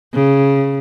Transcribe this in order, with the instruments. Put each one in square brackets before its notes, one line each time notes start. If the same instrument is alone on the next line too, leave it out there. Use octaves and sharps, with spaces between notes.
[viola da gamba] C#3